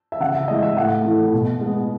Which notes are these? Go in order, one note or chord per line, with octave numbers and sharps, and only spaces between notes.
E5
C#3 F#5
E5
E3 G#3 D#5
E5
A2 F#5
E3 A3
B2
G#3 B3